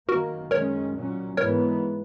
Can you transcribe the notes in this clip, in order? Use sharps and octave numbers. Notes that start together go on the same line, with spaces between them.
F#2 D#3 A#3 F#4 A#4
F#2 D#3 G#3 C#4 A#4 C#5
A#2 F#3 C#4
G#2 E3 B3 A#4 C#5